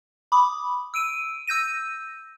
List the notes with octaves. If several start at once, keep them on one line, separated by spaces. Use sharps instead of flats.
B5 D6 D#6
E6 D7 D#7
E6 G6 A#6 D#7